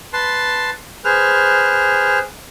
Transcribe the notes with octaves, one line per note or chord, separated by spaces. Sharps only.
B4 A5 C6
G#4 B4 C5 F6